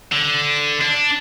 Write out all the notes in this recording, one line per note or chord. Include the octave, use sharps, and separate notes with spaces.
D3
D4